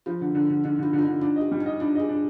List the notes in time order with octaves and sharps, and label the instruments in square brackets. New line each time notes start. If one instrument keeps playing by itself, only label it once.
[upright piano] F3 [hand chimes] F4
[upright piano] D3
D3
D3
[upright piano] D3 [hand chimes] D#4
[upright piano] D3 [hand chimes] F4
[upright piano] D3
[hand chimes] F4
D#4
[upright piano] D3
[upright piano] D4 [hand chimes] F4
[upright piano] D#5
[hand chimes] G4
[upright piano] G3
[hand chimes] D#4
[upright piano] D#5
[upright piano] D4 [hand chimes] F4
[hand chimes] G#4 [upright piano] D#5
[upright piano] D4